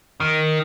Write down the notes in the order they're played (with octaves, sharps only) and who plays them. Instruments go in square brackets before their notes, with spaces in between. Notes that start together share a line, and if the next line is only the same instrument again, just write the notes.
[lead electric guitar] D#3